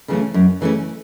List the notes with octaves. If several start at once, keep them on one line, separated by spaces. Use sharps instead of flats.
C#3 E3 A3 C#4
F#2
C#3 E3 A3 C#4